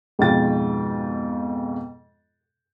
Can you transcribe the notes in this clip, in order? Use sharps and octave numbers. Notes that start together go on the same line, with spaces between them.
F2 G#2 B2 F4 G5 A6